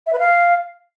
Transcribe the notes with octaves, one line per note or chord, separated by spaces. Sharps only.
E5
B4
F5